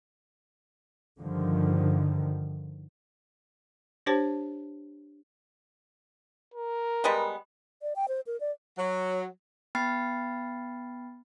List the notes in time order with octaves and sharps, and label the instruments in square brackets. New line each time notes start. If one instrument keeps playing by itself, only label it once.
[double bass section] G2 D3 D#3 F3
[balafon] D4 G4 C5 C#5 A5
[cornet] A#4
[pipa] G3 G#3 B3
[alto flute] D5
G5
C5
A#4
D5
[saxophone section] F#3
[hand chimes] B3 G5 B5 F6 A6 C7